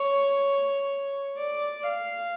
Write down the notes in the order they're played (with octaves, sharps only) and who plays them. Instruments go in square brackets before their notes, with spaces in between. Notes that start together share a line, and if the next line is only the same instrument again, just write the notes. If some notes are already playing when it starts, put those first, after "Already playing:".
Already playing: [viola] C#5
D5
F5